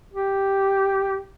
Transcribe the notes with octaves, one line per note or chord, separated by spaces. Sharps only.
G4